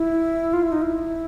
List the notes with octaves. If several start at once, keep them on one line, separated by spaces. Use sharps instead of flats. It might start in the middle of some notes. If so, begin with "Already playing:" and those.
Already playing: E4
F4
E4
D#4
E4